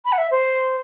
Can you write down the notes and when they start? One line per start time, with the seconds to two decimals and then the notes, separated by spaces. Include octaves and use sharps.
0.05 B5
0.12 F#5
0.18 E5
0.31 C5